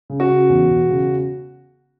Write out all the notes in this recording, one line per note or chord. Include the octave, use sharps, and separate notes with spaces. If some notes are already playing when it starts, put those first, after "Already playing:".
C#3
F#4
C#3
E2
E1
C#3